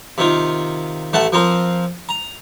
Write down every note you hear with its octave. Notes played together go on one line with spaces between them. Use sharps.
C3 D#3 F4
A1 A3 F#5 A5
F3 C4 A#4 C5
A#5